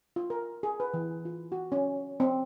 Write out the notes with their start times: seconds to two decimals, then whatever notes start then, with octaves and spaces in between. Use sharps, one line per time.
0.16 F4
0.30 A#4
0.63 G#4
0.80 B4
0.94 E3
1.25 F4
1.52 F#4
1.72 C#4
2.20 C4